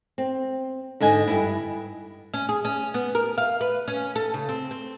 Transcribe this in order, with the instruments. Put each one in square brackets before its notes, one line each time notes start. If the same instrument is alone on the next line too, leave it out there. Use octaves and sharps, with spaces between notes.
[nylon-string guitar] C4
G#2 D3 D#5 G#5
G2 B2 E4
[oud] C#4
G#4
C#4
B3
A#4
F5
B4
C#4
A4
C#3
C4
C4